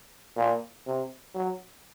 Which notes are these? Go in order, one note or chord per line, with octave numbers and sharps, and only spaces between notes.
A#2
C3
F#3